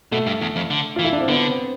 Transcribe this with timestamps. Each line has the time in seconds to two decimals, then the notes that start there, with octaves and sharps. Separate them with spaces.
0.12 B2 A3
0.27 G2
0.41 E2
0.56 F2
0.70 D3
0.96 E3 F4
1.04 E4
1.12 D4
1.21 C4
1.28 D3 B3
1.48 C4